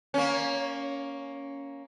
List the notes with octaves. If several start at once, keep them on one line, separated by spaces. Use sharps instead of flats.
A#3 C#4